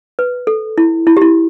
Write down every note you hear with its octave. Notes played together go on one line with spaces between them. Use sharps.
B4
A4
E4
E4
G4
E4